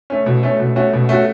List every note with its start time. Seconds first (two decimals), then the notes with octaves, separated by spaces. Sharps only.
0.10 A3 C#4
0.26 B2
0.43 A3 C#4
0.60 B2
0.76 A3 C#4 F#4
0.93 B2
1.09 A3 C#4 F#4